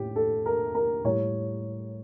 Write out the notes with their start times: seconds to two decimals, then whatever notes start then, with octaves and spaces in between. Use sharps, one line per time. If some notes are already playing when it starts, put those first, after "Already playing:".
Already playing: A2 G4
0.16 A4
0.46 A#4
0.75 A#4
1.04 A2 G3 C#5